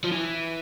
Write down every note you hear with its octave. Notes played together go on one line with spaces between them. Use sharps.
F3
E3